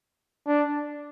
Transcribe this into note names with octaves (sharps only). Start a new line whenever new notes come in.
D4